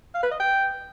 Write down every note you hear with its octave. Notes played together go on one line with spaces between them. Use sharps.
F5
B4
D#5
G5